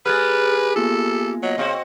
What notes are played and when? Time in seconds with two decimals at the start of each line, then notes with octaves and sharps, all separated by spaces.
0.06 G#3 G4 G#4 B4 F6 F#6 A6
0.76 A#3 B3 F4 A4
1.43 F#3 D#5
1.58 C#3 C4 F#4